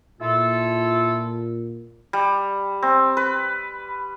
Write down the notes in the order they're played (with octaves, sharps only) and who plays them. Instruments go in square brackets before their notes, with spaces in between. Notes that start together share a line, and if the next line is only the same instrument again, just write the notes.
[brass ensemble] A#2 [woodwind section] E4 F4 A4
[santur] G3
C4
B4